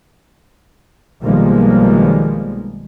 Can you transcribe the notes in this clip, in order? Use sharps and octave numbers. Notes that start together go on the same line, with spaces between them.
B1 D#3 F3 G3 G#3 A#3